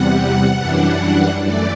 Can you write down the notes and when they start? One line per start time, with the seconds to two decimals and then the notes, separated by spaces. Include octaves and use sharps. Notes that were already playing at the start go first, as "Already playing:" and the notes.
Already playing: E2 C3 G3 F#5
0.60 F#2 E3 G3 D4
1.44 F#2 E3 A3 D5